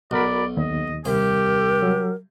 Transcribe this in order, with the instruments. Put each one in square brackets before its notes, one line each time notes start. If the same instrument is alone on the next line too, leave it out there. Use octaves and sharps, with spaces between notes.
[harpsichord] B1 [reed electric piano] F#4 A#4 B5 [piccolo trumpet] D5
[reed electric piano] D#2 [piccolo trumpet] D#5
[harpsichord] C2 C5 [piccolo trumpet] G4 [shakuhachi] A#4
[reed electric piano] F#3